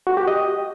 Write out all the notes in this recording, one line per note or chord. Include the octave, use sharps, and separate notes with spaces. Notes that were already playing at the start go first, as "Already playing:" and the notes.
F#4
G4
D#5